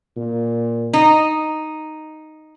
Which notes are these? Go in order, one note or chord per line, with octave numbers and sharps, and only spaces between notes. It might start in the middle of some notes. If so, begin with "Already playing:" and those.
A#2
D#4